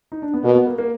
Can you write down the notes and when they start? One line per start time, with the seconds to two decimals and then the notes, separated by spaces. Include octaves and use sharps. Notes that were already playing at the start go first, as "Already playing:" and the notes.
0.12 D#4
0.22 D4
0.34 B3
0.44 B2 A#3
0.55 B3
0.67 A#3
0.78 A#3